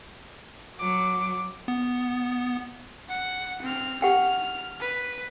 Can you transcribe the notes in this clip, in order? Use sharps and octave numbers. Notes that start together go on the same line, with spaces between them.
F#3 D6
B3
F#5
C4 F6
G4 F#5 G5 F6
B4